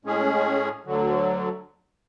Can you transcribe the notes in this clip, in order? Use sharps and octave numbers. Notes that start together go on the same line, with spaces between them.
A2 G#3 C#4 G#4
D2 D3 F#3